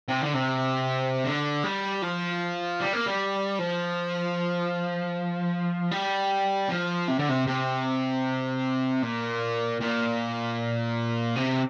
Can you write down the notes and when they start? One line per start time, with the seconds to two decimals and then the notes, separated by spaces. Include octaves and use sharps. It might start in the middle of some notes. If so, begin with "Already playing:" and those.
0.08 C3
0.21 D3
0.34 C3
1.25 D3
1.64 G3
2.02 F3
2.80 G3
2.93 A#3
3.06 G3
3.59 F3
5.91 G3
6.69 F3
7.08 C3
7.19 D3
7.29 C3
7.47 C3
9.03 A#2
9.80 A#2
11.36 C3